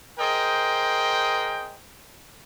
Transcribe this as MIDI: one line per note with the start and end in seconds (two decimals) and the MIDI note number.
0.19 1.78 68
0.19 1.78 70
0.19 1.78 72
0.19 1.78 75
0.19 1.78 79